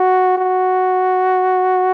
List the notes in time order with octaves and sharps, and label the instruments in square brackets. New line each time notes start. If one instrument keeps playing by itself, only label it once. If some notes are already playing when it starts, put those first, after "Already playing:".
Already playing: [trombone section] F#4
F#4